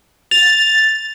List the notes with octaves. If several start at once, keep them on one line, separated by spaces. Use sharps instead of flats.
A6 F7